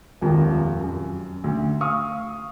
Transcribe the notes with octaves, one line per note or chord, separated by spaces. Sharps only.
D#1 G#1 F2
F#2
D2
F5 C#6 D#6 F6